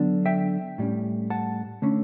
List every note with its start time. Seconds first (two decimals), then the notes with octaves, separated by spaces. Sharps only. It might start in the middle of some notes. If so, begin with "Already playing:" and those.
Already playing: D3 F#3 B3 D4
0.26 E5 G5
0.78 A2 G3 C#4
1.30 F#5 A5
1.82 D3 A3 C#4